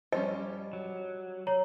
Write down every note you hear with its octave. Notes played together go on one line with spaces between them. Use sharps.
F3 G3 C#4 D#5
F#3
C#5 A#5